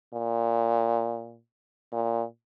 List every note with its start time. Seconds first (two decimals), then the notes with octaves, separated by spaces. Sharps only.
0.13 A#2
1.92 A#2